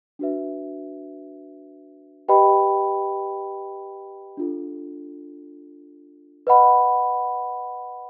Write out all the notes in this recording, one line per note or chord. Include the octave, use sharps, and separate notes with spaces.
D4 F#4 B4 E5
G4 B4 D#5 G5 B5
D4 F4 A4
B4 D#5 F#5 B5